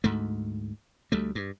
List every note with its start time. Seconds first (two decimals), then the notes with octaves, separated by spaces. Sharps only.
0.04 D2 G#2 A3
1.12 D2 G3 A3
1.35 G2